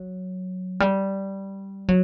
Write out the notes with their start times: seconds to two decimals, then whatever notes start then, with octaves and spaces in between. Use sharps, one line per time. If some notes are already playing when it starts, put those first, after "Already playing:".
Already playing: F#3
0.80 G3
1.88 F#3